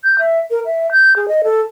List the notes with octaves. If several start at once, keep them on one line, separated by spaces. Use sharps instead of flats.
G6
E5
A#4
E5
G6
G#4
D#5
A4